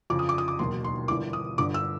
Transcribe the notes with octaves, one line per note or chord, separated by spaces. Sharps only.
F2 C#3 F3 D6
D#6
D6
D#6
D6
E1 D#2 D#3 F#3 C6
C6
G1 G2 E3 D6
D#6
G1 G2 D3 D6
E6